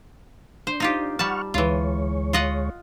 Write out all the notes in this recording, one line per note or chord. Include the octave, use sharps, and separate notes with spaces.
D4 C5
D#4 F4 G4
G3 F#5 A5 C#6 F6
D2 E3 G#3 F4 C#5
F4 D#5 F#5